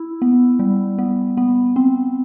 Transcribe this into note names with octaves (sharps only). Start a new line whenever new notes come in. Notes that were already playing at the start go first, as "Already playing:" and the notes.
Already playing: E4
B3
G3
B3
B3
C4